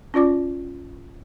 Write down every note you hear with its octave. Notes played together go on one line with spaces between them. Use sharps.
C#4 F4 D5 D6